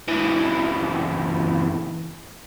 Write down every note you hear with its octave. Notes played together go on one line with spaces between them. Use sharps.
C#2 E3